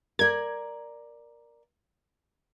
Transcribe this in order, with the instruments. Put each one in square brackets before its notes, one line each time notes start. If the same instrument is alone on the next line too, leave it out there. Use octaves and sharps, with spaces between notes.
[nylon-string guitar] A#4 D5 [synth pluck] G#6